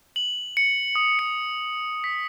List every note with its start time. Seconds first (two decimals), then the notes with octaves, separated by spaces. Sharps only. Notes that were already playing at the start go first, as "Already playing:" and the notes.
0.16 F#7
0.57 C#7
0.95 D#6
1.19 C#7
2.04 B6